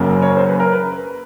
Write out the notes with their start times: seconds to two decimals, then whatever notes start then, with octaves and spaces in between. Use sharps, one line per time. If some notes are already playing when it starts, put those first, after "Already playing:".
Already playing: F#1 F#2 C#3 F#3 A#3
0.22 C#5
0.37 C5
0.48 B4
0.60 A#4
0.72 B4